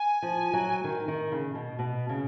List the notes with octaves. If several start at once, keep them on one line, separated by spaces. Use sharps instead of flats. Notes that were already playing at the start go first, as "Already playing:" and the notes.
Already playing: G#5
F3
F#3
D#3
D#3
C#3
B2
B2
C#3